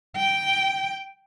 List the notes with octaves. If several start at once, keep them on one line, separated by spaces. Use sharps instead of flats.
G5